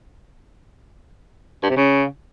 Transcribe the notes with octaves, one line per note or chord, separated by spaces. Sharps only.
G2
C3
C#3